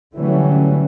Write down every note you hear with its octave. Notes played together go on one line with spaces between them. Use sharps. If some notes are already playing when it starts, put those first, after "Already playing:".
D3 E3 F#3 G3 A3 C#4